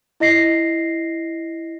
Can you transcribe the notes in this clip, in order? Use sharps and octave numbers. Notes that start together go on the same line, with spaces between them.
E4 D#5 A#6 C7